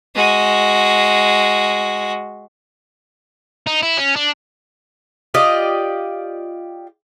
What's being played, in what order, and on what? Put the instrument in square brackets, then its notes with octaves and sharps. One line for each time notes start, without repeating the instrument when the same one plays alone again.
[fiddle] G#3 F#4
[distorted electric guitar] D#4
E4
C#4
D4
[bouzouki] F4 G4 D5 D#5